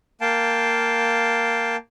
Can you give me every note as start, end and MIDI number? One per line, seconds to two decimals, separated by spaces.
0.21 1.76 58
0.21 1.76 77
0.21 1.76 79
0.21 1.76 81